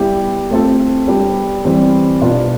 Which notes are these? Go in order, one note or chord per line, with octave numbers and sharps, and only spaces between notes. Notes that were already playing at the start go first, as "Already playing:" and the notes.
Already playing: G3 B3 E4 G4
A3 C4 F4 A4
G3 B3 D4 G4
E3 G3 C4
B2 B3 D4 F4 B4